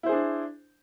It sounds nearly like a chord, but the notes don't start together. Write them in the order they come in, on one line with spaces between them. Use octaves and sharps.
E4 C5 G#4 D4